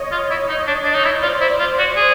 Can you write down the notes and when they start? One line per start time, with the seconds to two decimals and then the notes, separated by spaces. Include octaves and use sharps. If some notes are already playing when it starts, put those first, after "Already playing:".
Already playing: C#5 D#5
0.12 F4
0.31 E4
0.49 D#4
0.67 D4
0.84 D4
0.94 D#4
1.04 E4
1.23 F4 C5 D5
1.41 E4
1.60 F4
1.79 F#4
1.96 G#4